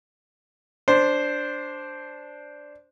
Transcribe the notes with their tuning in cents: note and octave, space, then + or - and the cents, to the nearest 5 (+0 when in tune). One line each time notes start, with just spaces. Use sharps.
D4 -5 C5 +0